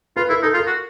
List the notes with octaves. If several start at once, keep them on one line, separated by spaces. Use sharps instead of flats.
F4 B4
E4 A#4
D#4 A4
F4
A#4
F#4